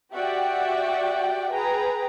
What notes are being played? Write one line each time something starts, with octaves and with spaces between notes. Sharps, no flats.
F#4 G4 D5 E5 F#5 G5
G#4 B4 G5 A#5